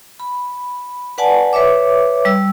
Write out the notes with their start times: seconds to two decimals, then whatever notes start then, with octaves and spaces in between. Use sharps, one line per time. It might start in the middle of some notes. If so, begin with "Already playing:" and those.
0.20 B5
1.18 B4 D5 F#5 G#5 A5
1.53 B4 C#5 E5 D6
2.25 G3 E6